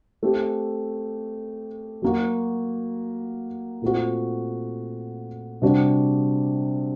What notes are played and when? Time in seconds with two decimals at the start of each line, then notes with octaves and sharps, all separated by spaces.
0.23 A3 C4 G4
2.02 F#3 A#3 F#4
3.82 A#2 A3 C4 F#4
5.62 C3 G3 D4 F#4